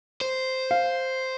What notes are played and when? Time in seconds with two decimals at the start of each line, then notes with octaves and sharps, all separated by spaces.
0.21 C5
0.71 F5